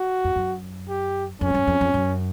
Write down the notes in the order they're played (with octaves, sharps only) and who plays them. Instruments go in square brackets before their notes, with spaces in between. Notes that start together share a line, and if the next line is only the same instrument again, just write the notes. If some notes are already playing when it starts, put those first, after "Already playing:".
Already playing: [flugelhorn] F#4
[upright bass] F2
F#2
[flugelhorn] G4
[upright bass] F2 [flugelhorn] C#4
[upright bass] G2
F#2
F2
F2
F#2